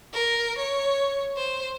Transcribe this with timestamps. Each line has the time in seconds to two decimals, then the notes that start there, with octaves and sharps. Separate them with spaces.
0.13 A#4
0.58 C#5
1.36 C5